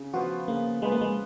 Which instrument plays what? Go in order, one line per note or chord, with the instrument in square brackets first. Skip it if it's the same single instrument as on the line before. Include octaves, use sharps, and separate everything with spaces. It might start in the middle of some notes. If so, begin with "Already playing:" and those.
Already playing: [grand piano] C#3
[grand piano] F3 B3 F4 B4 [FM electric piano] F#4
[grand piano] C#3 [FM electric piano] A#3
[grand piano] F3 B3 F4 B4 [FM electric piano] G#3
[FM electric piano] A#3
G#3